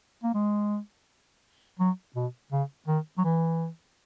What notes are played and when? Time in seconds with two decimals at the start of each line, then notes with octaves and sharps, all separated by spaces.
0.23 A#3
0.34 G#3
1.79 F#3
2.16 B2
2.52 C#3
2.87 D#3
3.18 F#3
3.24 E3